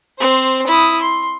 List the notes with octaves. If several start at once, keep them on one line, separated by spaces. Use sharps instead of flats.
C4 C5
E4 D#6
C6